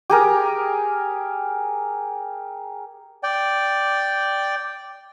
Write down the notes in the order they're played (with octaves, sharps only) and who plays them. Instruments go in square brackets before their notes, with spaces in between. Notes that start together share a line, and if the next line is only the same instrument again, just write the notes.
[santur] G4 G#4 A#4
[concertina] D5 G5